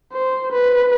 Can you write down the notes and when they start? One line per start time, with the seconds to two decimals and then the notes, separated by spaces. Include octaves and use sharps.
0.12 C5
0.52 B4